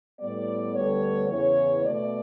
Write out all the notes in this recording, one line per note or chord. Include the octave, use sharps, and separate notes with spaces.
A2 G3 B3 D5
D2 D3 G3 B3 C#5
E2 C#3 E3 C#5
B2 A3 D5